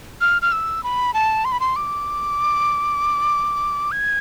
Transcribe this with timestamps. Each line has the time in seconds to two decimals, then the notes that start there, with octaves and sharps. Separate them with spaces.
0.21 F6
0.42 F6
0.52 E6
0.84 B5
1.14 A5
1.45 C6
1.52 B5
1.60 C6
1.76 D6
3.92 G#6